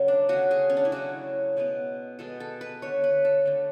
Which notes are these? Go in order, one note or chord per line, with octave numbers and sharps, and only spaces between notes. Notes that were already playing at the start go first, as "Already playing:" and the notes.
Already playing: C#3 F#3 A3
D4
C#3 F#3 A3 F#4
G#4
C#4
D4
E4
C#3 F#3 A3 F#4
B2 G#3 B3
B2 G#3 B3 A4
A4
B4
D3 A3 C#5
B4
A4
D3 A3